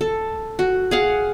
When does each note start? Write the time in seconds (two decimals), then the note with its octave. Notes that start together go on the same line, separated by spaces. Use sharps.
0.01 A4
0.59 F#4
0.91 G#4 F5 F#5